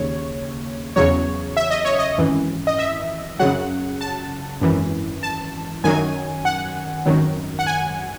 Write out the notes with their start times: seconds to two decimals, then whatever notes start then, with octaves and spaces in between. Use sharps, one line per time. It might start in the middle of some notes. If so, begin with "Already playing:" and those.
Already playing: D#2 C#3 C#5
0.96 E2 C#3 F#3 C#5
1.57 E5
1.70 D#5
1.85 C#5
1.99 D#5
2.18 G#1 F#2 E3
2.67 D#5
2.78 E5
3.39 F#2 C#3 F#3 F#5
4.01 A5
4.62 G#1 F#2 E3
5.23 A5
5.84 F#2 D#3 F#3 G#5
6.45 F#5
7.06 G#1 F#2 D#3 F#3
7.59 F#5
7.67 G#5